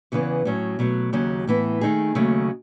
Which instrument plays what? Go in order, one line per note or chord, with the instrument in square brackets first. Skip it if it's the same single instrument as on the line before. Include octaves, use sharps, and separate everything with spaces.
[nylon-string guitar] E2 C#3 E3 B3
A2 F#3 C#4
B2 F#3 A3
D#2 C#3 F#3 C#4
A2 E3 B3 E4
D#3 A3 D#4 G#4
D#2 C#3 F#3 A3